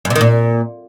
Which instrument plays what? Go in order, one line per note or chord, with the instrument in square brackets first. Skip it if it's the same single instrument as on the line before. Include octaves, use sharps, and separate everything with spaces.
[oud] F#2
C3
D#3
A#2